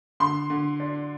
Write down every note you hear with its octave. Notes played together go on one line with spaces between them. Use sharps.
D3 C6
D3
D4